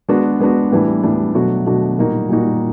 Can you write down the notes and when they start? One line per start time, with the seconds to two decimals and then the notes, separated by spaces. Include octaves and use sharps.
0.09 G#3 B3 D4 F#4
0.40 G#3 B3 D4 F#4
0.72 A2 E3 G3 B3 D4
1.03 A2 E3 G3 B3 D4
1.34 B2 F#3 A3 D4 F#4
1.66 B2 F#3 A3 D4 F#4
1.98 A#2 G3 A#3 D#4 F#4
2.29 A#2 G3 A#3 D#4 F#4